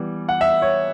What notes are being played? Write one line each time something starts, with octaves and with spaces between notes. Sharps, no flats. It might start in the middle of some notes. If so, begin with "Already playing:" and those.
Already playing: E3 G3 B3
F#5
E5
C#5